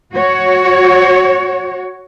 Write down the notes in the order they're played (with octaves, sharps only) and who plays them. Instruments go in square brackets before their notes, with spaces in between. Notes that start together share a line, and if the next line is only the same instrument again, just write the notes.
[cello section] F#4 C#5